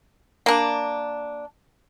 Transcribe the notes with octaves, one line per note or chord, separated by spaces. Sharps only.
A#3 D4